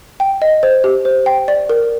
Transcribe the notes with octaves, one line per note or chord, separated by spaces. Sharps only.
G5
D#5
C5
G4
C5
G5
D5
A#4